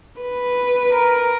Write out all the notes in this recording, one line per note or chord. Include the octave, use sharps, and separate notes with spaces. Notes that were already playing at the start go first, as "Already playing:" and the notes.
B4
A#4